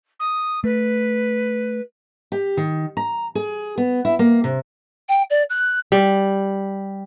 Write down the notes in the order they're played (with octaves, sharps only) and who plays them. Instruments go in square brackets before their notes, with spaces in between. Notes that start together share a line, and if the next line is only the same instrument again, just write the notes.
[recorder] D#6
[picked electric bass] A3 [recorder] B4
[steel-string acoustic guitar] G4
D#3
A#5
G#4
B3
E4
A#3
C3
[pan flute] G5
D5
F#6
[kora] G3